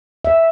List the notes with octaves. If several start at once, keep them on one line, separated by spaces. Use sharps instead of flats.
E5